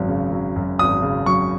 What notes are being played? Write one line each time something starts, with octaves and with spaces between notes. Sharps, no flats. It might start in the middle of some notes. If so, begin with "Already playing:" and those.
Already playing: G#1 F#2 F#3
C#3
F#3
F#2
G#1 D#6
C#3
F#3 C#6